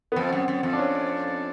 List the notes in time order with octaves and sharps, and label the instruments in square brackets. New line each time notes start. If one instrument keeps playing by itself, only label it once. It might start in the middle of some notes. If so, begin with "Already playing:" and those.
[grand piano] B3
[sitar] F2 [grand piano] C4
[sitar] F#2
F#2
F2
[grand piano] D4
C#4